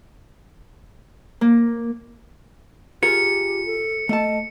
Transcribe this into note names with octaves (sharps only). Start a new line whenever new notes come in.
A#3
F4 G4 G#4 A#4 C#7
A4
A3 D#5 A5